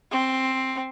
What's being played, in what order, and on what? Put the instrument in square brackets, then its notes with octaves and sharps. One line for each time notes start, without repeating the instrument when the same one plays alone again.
[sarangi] C4